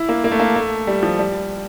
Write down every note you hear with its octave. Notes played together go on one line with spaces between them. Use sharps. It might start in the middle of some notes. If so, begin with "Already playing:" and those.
Already playing: E4
A#3
A#3
A3
A#3
A3
G3
F3
G3